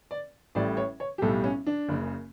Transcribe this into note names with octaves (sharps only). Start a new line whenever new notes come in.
D5
A1 A2 G3 D5
C#5
C#5
G4
B1 A2 G3 A4
C#4
D4
F#1 F#2 C#3